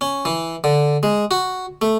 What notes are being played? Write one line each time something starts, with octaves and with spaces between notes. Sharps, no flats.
C#4
E3
D3
G#3
F#4
A3